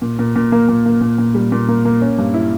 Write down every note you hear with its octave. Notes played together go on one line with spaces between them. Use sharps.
A#2
A#2
A#2
A#3
A#2
A#3
A#2
A#2
G3
A#2
A#3
A#3
C#4
G2
E4